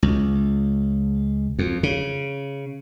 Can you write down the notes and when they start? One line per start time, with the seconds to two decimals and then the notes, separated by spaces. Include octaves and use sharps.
0.03 C#2
1.59 F2
1.83 C#3